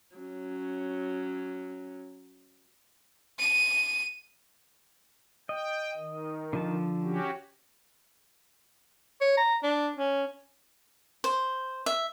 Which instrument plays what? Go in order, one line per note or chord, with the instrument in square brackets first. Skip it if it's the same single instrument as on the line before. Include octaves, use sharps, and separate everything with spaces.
[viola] F#3 C#4
[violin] D#7
[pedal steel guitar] D#5 [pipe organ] G5
[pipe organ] D#3
[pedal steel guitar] D3 F3 A5
[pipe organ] C#4 F#4 G4
[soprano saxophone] C#5
A#5
D4
C#4
[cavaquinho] C5
E5